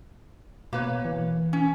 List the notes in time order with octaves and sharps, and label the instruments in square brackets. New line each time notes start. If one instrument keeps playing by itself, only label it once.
[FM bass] B2 [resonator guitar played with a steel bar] A#3 B4 C#5
[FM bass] E3
[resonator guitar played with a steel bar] C#4